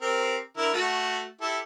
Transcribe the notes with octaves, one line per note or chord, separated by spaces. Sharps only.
C4 G4 A#4
D3 E4 A#4
A3 F#4
E4 G4 A4